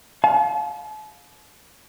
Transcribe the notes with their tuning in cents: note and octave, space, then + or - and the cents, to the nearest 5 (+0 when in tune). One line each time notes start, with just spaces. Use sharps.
F5 +25 A5 -45